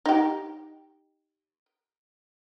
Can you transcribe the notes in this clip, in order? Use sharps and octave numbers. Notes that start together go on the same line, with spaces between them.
D#4 G4